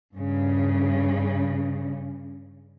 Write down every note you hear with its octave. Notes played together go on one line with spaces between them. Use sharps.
G2 C#3